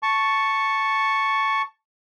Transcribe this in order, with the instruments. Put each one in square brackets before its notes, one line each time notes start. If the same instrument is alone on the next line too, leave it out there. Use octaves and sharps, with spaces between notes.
[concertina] A5 C#6